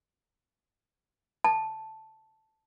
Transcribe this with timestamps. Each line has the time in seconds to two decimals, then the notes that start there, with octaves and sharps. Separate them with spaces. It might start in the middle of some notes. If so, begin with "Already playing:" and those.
1.44 A5